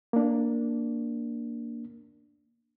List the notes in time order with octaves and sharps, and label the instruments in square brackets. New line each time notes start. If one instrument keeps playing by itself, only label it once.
[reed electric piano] A#3 D4